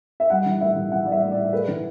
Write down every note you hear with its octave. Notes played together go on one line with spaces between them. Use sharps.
E5
G3 F#5
E3
A2 E5
E3
E3 F#5
G3 D5
E5
A2
D5
A2
A3 B4
E3